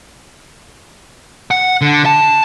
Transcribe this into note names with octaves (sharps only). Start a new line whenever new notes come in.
F#5
D3
A5